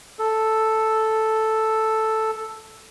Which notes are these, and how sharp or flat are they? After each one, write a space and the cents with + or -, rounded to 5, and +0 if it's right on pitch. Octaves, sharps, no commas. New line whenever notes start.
A4 +0